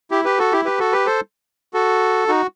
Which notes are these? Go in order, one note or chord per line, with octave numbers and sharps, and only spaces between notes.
E4 G4
G4 B4
F#4 A4
E4 G4
G4 B4
F#4 A4
G4 B4
A4 C5
F#4 A4
D#4 F#4